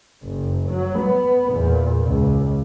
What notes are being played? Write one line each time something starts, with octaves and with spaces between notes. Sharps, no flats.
F#1
F#3
B3
E2 A#2
C#2